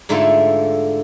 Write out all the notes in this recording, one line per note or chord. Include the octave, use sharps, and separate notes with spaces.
G#2 D3 A3 E4 F4 E5